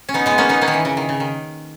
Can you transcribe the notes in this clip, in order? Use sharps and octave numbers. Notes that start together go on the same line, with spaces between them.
C#4
B3 D#4
G#3 B3
A#3 C#4
B3 D#4
A#3 C#4
D#3
E3
C#3
D#3
C#3
D#3